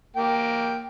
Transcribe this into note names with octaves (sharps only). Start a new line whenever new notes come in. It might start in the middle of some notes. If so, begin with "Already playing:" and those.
A#3 G5